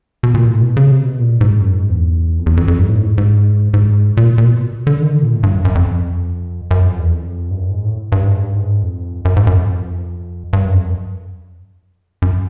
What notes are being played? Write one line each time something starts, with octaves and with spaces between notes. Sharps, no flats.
B2
A#2
A2
B2
C#3
C3
B2
A#2
G#2
F#2
G#2
E2
F2
E2
F2
F2
G2
A2
G#2
G#2
G#2
A#2
A#2
B2
D3
D#3
D3
A#2
A2
G2
F#2
F#2
F2
F#2
F2
E2
F2
G2
F#2
G#2
A2
G2
G#2
G2
G#2
F2
F#2
G#2
F#2
F2
G2
F#2
F2
F#2
F#2